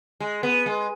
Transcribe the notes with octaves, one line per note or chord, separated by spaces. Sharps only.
G#3
B3
G#3